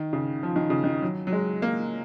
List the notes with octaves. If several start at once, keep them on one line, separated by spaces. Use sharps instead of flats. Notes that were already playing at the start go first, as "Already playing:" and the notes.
Already playing: D#3
C#3
F3
D#3
C#3
D#3
F#3
F#3
G#3
A#3